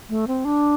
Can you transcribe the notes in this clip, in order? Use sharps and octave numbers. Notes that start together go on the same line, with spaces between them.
A3
C4
D4